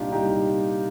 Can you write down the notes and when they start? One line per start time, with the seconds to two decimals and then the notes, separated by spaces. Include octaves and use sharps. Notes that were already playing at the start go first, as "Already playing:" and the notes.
Already playing: C2 A#2 G3 D4 D#4 F4 G4
0.12 C2 A#2 G3 D#4 G4